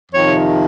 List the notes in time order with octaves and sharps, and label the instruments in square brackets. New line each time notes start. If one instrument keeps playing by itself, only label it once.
[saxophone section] F2 C3 D#3 C#5